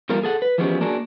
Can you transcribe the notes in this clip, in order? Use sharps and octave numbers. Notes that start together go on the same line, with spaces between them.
E2 G3 A#3 F4 A#4
G#4 A4 F#5
B4
E3 F3 G#3 B3 C#4 G4
A#3 D4 F#4 G#4 A#4